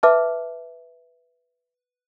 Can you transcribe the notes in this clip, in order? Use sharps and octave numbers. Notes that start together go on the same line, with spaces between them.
B4 E5 A5 D6 F6